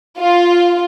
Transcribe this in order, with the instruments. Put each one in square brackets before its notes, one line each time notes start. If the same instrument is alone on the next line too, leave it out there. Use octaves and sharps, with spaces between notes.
[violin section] F4